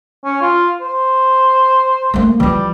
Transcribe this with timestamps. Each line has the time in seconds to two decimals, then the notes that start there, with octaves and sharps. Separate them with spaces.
0.25 C#4
0.41 F4
0.81 C5
2.14 A3 A#3
2.40 E3 F3 G3